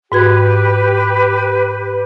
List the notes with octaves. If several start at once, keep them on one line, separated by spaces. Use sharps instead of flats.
G#2 F#4 G4 B4 G#6